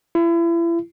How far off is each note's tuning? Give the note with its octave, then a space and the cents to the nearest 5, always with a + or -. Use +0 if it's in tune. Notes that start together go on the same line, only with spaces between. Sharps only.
E4 +35